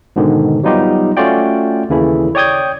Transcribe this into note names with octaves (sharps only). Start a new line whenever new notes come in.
G#2 B2 D3 D#3
F#3 G3 B3 D#4 F4 G4
A3 C#4 F4 F#4 D5 G5
D#2 C#3 E3 E4 A4
C#5 D5 G5 D#6 G6 G#6